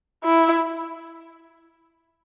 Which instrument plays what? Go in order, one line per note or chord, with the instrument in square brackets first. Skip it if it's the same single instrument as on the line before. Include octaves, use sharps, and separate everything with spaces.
[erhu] E4